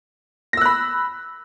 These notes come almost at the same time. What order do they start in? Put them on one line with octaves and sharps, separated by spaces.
A#6 E6 F#6 B5